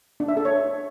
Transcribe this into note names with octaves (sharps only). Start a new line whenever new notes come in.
D4
E5
A4
C#5